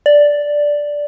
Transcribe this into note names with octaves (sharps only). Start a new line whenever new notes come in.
D5